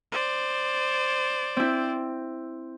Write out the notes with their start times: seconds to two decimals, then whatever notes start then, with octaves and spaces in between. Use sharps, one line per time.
0.12 C5 D5
1.57 C4 E4